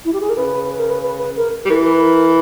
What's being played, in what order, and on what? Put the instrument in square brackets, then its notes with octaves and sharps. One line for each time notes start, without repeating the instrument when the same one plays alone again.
[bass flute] E4
G4
G#4
A#4
[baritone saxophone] C#3 [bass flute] B4
[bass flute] B4
A#4
B4
B4
B4
A#4
[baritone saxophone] G3
[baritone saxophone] E3 [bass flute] A#4
[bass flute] B4
A#4
B4
A#4